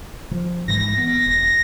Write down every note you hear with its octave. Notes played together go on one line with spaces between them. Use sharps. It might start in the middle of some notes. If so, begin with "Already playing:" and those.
F3
G#2 E3 G#3 A#6
B3
E1